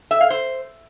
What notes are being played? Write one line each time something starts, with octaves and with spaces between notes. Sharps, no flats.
E5
F5
C5